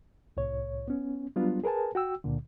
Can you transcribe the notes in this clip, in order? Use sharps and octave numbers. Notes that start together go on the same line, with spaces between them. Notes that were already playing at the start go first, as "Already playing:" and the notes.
C2 A2 C#5
B3 C#4
F#3 G3 B3 D4 F4
G#4 A#4 B4 G#5 A5
F#4 G5 E6
C#2 A#2 D3